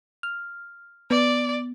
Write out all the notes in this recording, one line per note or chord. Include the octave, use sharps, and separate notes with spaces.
F6
B3 D5